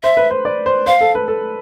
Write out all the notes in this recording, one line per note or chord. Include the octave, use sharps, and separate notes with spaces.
C5 E5
B4
C5
D5
C5
C5 F5
A4
B4
A4